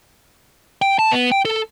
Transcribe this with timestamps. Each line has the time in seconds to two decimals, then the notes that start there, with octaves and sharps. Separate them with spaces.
0.82 G5
0.99 A5
1.12 B3
1.32 G5
1.45 A4